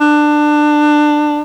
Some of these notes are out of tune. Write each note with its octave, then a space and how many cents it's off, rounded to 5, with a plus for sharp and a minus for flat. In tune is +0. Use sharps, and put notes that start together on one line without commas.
D4 +20